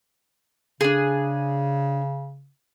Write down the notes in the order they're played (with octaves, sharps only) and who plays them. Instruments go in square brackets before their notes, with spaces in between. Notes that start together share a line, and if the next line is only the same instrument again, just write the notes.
[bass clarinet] C#3 [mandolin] D4 G#4